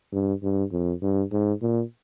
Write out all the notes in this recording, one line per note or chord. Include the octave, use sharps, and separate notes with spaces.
G2
G2
F2
G2
G#2
A#2